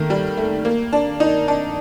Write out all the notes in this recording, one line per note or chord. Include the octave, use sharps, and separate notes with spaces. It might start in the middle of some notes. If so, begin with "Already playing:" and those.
Already playing: D#3 A3 A#3
G3
A3
A#3
D4
D#4
D4